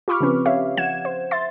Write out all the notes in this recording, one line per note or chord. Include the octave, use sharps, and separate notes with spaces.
F4 G4 B5 C#6 D6 F6
C#3 F3 C4 C#4 B4
G4 C#5 E5 F5
F3 F#5 G#6 E7
C5
E5 C6 A6